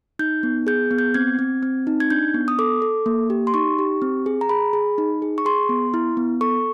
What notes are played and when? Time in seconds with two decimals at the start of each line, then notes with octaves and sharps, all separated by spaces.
0.19 D#4 G6
0.43 B3
0.67 G#4 G6
0.91 B3
0.98 G6
1.14 C4 G#6
1.39 C4
1.63 C4
1.87 D#4
2.00 G#6
2.10 D4 G6
2.34 B3
2.48 D#6
2.59 A4 D6
2.82 A4
3.06 A#3
3.30 G4
3.47 C6
3.54 D#4 C#6
3.79 G4
4.02 C4
4.26 G#4
4.41 A#5
4.49 G#4 B5
4.73 G#4
4.98 D#4
5.22 G#4
5.38 C#6
5.45 G#4 C6
5.69 B3
5.94 E4
6.17 B3
6.41 A4 C#6